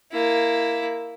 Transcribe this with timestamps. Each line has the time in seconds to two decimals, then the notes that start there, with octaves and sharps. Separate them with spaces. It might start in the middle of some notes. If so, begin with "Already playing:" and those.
0.13 A#3 E4